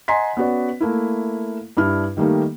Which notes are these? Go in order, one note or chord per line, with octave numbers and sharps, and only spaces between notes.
D#5 F#5 G#5 A#5 C6 B6
B3 C#4 F#4 B4 D5
A3 A#3 E4
G2 D4 E4 F6
D#3 G3 A3 A#3 D#4